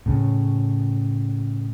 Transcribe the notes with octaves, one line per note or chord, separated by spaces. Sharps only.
A2 C#3